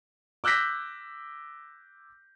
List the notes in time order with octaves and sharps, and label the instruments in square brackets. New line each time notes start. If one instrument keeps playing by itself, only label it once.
[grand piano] D6 E6 F#6 G6 A#6 B6